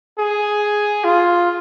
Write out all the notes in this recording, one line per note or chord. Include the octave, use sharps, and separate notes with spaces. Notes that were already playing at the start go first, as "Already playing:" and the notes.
G#4
F4